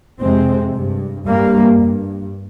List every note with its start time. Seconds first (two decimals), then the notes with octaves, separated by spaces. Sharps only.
0.21 F2 C3 G#3 C4
0.74 G2
1.27 G2 G3 A#3
1.81 G2